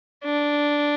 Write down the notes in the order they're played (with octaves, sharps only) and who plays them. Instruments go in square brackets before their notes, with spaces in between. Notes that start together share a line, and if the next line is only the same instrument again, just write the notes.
[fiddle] D4